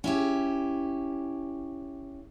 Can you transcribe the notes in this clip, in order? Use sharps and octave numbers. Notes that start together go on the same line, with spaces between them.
C#4 E4 G4